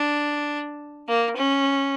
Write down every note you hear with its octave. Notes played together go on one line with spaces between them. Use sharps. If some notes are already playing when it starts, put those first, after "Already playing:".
Already playing: D4
A#3
C#4